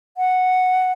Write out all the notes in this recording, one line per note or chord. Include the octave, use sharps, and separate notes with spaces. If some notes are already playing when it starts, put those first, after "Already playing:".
F#5